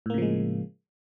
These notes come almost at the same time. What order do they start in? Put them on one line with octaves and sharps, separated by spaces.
A2 A#3 C#3 F3 G#3